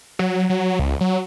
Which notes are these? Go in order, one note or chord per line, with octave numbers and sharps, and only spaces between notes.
F#3
F#3
C#2
F#3